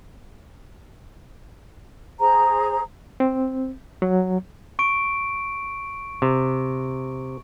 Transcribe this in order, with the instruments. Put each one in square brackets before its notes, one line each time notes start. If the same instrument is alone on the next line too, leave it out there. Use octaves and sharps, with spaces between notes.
[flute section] G#4 C5 A#5
[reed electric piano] C4
F#3
[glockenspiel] C#6 D7
[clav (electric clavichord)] C3